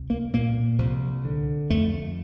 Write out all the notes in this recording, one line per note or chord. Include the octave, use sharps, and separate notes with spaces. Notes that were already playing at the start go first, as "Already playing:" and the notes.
Already playing: C2
A#3
A#2 A#3
C2 F3
D3
F2 A3